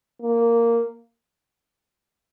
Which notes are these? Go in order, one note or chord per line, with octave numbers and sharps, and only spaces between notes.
A#3